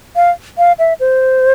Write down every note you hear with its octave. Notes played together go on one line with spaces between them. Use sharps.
F5
F5
E5
C5